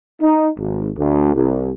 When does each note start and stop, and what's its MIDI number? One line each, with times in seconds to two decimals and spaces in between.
0.21 0.47 63
0.57 0.88 32
0.98 1.34 38
1.34 1.71 36